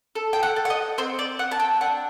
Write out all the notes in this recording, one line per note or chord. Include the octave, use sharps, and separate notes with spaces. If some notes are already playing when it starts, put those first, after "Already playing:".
A4
G5
F#5
A4
F#5
D#5
C4 C5
D5
C4 F#5
A5
G5
D4 F#5